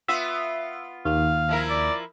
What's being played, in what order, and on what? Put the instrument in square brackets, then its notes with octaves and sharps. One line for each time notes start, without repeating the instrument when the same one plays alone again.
[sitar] B3 F4 [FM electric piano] E5
[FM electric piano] D#2 [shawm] F5
[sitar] F3 E4 A#4
[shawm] D5